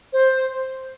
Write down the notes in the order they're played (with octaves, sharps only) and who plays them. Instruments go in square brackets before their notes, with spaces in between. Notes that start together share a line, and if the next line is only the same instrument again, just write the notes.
[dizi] C5